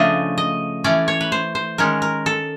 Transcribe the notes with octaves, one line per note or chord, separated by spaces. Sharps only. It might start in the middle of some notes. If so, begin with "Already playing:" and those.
Already playing: C#3 F3 A3 D4 D#5
D#5
E3 A3 C#4 D5
C#5
B4
C5
C5
D#3 G#3 C#4 A#4
A#4
A4